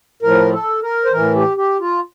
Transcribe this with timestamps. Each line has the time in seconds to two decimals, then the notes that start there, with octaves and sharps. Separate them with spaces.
0.22 A2 F3 A#4
0.53 A4
0.83 A#4
1.05 C5
1.12 A2 E3 A#4
1.36 G4
1.57 G4
1.80 F4